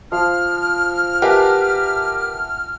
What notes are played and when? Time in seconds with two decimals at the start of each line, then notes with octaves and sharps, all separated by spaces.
0.12 F3 F5 F6
1.22 G4 A#4 B4 E5 F#5 G#5 A5